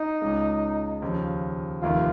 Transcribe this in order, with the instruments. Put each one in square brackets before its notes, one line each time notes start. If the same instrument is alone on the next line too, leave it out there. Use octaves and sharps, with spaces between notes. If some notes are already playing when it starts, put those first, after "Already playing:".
Already playing: [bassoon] D#4
[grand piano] C#2 C#3 G#3 C#4
D#2 C#3 F3
[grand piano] F1 D#2 D#3 [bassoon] F4